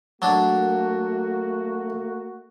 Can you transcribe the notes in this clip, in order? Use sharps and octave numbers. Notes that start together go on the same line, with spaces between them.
F#3 A3 A#3 D4 F#4